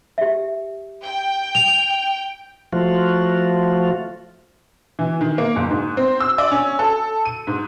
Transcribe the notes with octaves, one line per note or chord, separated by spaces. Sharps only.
G4 E5
G5
F7
F3 A3 F4 F#4
E3
D#3
A#3
F#1
G#2
C4
E6
D5
C#4
A4
D#7
G#2